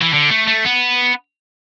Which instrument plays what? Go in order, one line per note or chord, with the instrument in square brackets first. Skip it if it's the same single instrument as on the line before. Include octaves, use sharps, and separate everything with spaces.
[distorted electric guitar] E3
D3
A3
A3
B3